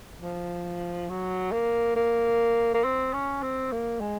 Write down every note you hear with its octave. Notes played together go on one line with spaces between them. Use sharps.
F3
F#3
A#3
A#3
A#3
C4
C#4
C4
A#3
G#3